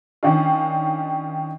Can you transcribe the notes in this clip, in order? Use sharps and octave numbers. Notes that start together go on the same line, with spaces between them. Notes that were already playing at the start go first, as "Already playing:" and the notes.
D#3 C#4 D4 F4